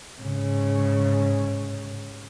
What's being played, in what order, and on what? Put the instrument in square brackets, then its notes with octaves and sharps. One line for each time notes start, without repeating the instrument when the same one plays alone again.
[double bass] G#2 C#3